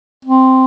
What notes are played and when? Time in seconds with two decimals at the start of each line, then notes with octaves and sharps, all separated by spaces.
0.25 C4